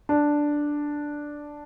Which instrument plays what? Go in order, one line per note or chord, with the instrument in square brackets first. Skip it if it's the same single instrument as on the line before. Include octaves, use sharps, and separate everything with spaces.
[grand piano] D4